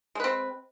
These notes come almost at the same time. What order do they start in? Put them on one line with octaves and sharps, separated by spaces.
G#3 B4 C4